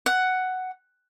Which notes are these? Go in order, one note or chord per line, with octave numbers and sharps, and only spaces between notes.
F#5